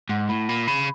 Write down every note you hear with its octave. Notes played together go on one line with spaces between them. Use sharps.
G#2 F#5
A2 B5
A#2 B5
C#3 B5